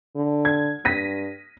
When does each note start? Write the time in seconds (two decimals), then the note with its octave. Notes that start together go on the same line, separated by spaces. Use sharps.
0.16 D3
0.45 G#6
0.85 G2 A#6 B6 D#7